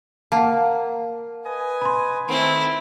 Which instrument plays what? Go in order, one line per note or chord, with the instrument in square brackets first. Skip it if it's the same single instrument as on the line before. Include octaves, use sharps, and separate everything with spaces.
[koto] A#3 [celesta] F#5 A5
[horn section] B4 D#5 G#5
[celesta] B5 C6
[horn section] D#3 A3 [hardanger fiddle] C4 E4